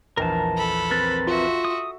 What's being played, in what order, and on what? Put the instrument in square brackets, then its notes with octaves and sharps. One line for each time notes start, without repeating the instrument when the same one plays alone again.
[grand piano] A#1 E2 [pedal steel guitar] A#4 A5
[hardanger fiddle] A4 B5
[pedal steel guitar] C4 A#4 B4 [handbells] A6
[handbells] F4 [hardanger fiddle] F#4 E5
[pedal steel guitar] D#6